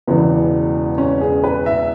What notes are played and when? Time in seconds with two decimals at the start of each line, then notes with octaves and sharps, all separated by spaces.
0.07 E1 E2 C#3 E3 B3
0.98 C#4
1.21 G#4
1.44 B4
1.66 E5